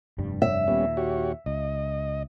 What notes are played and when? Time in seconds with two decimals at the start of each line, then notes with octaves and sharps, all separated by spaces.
0.18 F1 G2 G3
0.42 E5
0.68 D#2 A#2 G3 B3 C#4
0.97 F#4 G4 C#5
1.46 C#2 D#5